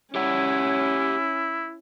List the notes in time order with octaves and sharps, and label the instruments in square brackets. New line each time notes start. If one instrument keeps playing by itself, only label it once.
[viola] C#4 [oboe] E4 [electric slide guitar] G4 C#5 F#5